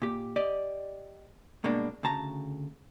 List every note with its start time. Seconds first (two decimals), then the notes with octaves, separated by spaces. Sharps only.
0.02 A#2 G4
0.36 G4 D5 D#5
1.64 G2 B2 G#3 A#3 D4
2.03 D2 C#3 A5 A#5